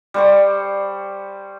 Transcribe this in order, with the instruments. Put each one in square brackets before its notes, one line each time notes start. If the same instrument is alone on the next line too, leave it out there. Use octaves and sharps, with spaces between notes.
[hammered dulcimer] G3 C5 C#6